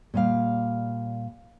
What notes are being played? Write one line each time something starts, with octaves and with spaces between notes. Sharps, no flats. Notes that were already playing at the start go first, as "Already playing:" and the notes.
A#2 G3 F5